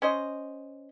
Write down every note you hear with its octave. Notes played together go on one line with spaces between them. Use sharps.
C#4 C5 D#5